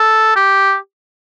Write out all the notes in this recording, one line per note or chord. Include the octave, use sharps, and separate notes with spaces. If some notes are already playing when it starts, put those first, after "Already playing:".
Already playing: A4
G4